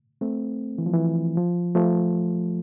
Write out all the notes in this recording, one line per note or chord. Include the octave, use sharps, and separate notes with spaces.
A3 C4
E3
F3
E3
F3
F3 A3